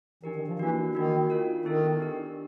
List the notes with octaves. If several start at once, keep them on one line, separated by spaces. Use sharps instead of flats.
E3 D4 G4 A#4
D#3
F3
E3 A#3 D4 F#4
D#3 A#3 D#4 F#4
D4 F4 A#4
D#3 B3 E4 A4
D4 G4 A#4